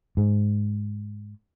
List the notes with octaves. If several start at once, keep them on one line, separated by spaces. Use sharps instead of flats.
G#2